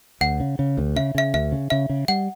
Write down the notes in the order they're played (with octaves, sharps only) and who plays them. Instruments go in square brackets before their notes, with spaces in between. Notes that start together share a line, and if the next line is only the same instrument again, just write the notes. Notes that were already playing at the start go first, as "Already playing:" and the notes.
[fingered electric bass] D2 [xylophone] F#5
[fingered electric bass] C#3
C#3
D2
[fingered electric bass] C#3 [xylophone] E5
[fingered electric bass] C#3 [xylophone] E5
[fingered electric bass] D2 [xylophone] E5
[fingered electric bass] C#3
[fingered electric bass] C#3 [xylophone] E5
[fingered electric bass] C#3
[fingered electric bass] G3 [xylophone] F#5